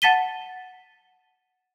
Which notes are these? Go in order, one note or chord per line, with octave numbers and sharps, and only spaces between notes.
F#5 A5 A6 B6 D#7 G7